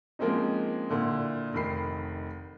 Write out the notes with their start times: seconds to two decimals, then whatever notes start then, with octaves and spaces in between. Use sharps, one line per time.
0.19 F3 G#3 A#3 C4 C#4 D#4
0.90 A#2 D3 E4
1.54 F1 D#3 B5 C7